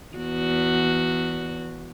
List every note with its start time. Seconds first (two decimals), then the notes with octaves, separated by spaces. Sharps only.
0.15 E2 F#4